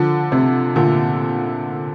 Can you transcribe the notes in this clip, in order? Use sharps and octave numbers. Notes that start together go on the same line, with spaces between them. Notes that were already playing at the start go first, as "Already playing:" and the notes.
Already playing: D3 F3
C3
A#2 D3